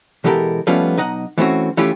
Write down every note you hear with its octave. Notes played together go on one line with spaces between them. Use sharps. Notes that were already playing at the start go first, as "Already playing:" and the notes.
B2 E3 G#3 G4 A4 A#4
F3 G3 A3 B3 C#4 F4
B1 D#4 D#5 F#5
E3 A3 C4 C#4 F#4
E3 A3 C#4 E4 F4 G4